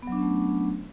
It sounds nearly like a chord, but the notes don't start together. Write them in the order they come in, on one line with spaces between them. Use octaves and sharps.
B3 F#3 D4 C#4 A3